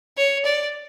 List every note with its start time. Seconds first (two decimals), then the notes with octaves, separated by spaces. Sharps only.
0.18 C#5
0.45 D5